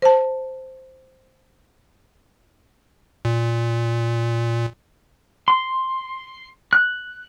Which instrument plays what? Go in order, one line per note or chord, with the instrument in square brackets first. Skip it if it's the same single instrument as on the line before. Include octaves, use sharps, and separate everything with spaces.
[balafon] C5 A5
[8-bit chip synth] A#2
[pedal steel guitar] C6
F#6